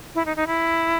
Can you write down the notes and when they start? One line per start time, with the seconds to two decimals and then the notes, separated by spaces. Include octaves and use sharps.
0.15 E4
0.26 D#4
0.37 D#4
0.47 E4